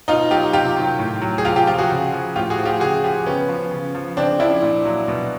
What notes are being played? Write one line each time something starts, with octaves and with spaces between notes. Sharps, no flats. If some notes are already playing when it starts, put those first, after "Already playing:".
B2 D#4 F4
F#3 F4 G4
C3 F4 G4
D#3 F#3
A2
F#3
G#4
C3 F4 G4
F4 G4
F3 F4 G4
F#4 G#4
C#3
F3
A2 F4 G4
F#4 G#4
F3
F4 G4
C#3 F#4 G#4
F3 F4 G4
C#3 B3 C#4
F3
C#3
F3
C#3 C4 D4
F3 D4 E4
A#2
F#3
B2